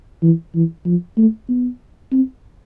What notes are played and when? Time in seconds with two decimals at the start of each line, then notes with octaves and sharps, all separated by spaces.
0.22 E3
0.55 E3
0.86 F3
1.17 A3
1.49 B3
2.12 C4